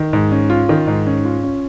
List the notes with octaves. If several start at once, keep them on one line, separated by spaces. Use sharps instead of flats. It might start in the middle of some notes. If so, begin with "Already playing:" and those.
Already playing: D#3
G#2
C#4
F4
D#3
G#2
C#4
F4
C#4